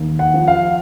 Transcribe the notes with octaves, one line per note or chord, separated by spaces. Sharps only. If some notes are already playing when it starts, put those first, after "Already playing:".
Already playing: D#2
F#5
F3
F5